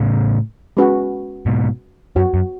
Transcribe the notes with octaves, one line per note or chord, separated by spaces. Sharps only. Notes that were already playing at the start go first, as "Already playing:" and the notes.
Already playing: A2 C#3
G#3 C#4 F#4 B4
G#2 B2
F#2 F#4 C#5 F#5
F#2